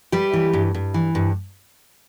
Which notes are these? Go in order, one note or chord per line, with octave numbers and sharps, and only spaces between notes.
G3 G4 B4
E3
G2
G2
E3
G2